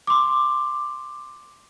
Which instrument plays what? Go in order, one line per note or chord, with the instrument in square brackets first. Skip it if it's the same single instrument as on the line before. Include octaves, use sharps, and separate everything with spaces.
[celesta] C6 D6